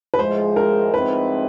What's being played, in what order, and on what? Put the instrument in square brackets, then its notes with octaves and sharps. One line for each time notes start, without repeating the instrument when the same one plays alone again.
[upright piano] B4
[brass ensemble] A2 F3 G#3 [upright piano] C5
[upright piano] A#4
[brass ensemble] A2 F3 G#3 C4 D#4 [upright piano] B4